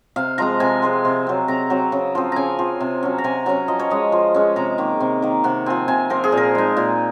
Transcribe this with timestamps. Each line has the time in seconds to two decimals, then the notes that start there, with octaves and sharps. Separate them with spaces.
0.16 C3 F5
0.38 F3 G#3 C4 A#5
0.60 C3 G#5
0.82 F3 G#3 C4
1.05 C3
1.27 F#3 C4
1.48 C3 A#5
1.70 F#3 C4
1.92 C#3
2.15 F3 C4
2.32 C#3 G#5 A#5
2.59 F3 C4
2.80 C3
3.03 F#3 C#4
3.18 A#5
3.24 C3 G#5
3.46 F#3 C#4 A#5
3.68 F3 D#5
3.79 C#5
3.90 G#3 C#4 D#5
4.12 F3
4.34 G#3 C#4
4.56 C3 A#5
4.78 D#3 A#3
5.00 C3
5.22 D#3 A#3
5.44 C3 F#5
5.66 F3 C4 G#5
5.88 C3 G#5
6.10 F3 C4 A#4
6.24 G#4
6.32 A#2
6.37 A#4
6.55 G#3 D#4
6.77 A#2